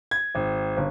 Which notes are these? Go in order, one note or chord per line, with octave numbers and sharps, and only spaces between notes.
G#6
G#1
G1